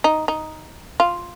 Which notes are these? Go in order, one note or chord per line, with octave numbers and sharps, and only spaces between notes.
D#4
D#4
F4